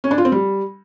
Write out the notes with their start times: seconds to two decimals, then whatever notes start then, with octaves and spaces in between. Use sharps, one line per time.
0.04 C#4
0.11 D4
0.18 F4
0.25 C4
0.32 G3